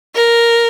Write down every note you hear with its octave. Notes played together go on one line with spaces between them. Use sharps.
A#4